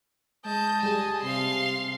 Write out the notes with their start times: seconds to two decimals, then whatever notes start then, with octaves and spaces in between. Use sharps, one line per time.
0.45 G#3 D#5 A5 G6
0.83 G3 G#4 G#5
1.23 C3 F5 C6 C7